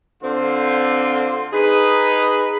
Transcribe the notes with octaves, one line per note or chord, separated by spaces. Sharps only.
D3 C4 F4
D#4 G#4 B4